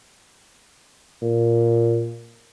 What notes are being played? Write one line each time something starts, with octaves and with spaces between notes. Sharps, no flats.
A#2